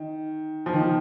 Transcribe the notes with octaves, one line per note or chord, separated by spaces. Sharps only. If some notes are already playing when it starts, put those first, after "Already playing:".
Already playing: D#3
F3
D#3
F3